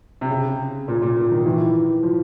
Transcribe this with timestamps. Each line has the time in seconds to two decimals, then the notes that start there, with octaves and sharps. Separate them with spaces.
0.21 C3
0.30 C#3
0.88 A#2
1.02 A#2
1.17 A#2
1.31 D#3
1.46 E3
2.03 F3